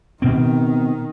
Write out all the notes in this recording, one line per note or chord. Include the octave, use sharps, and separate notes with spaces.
B2 D#3 C4